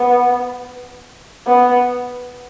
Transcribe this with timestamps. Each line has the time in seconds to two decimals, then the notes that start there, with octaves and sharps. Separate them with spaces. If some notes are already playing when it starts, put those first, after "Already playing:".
Already playing: B3
1.47 B3